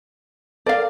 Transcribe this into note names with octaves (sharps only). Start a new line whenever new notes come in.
A4 A#4 D5 F5